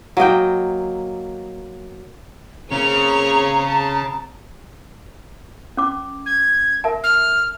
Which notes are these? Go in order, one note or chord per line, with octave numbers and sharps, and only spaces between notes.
F#3 A#3 D#5 G5
C#3 A#3 C4 C#4 G#4 C#5 A#5 F7
A5
C#4 D6
G#6
A#4 E5 A5
F6